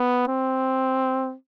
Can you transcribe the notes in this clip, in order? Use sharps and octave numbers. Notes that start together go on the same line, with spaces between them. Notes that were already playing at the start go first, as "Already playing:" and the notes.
Already playing: B3
C4